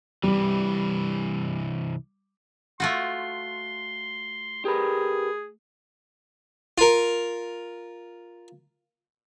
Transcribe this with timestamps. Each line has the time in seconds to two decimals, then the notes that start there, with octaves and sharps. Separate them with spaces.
0.23 C2 E3 G3
2.80 A3 F4 F#4 C6
4.65 G4 G#4 A#4 B4
6.78 F4 A#4